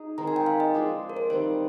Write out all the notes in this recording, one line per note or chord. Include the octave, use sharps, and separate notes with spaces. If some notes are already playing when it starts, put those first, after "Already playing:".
Already playing: D#4 G#4
D#3 G#3 C4 A#5
G#5
G5
F5
D#5
F3 G#3 D4 G#4
A#4
C5
D#3 G3 C4 D#4 C5